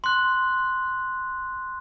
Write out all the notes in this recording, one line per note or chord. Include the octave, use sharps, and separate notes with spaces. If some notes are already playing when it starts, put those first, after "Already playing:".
C6 F#6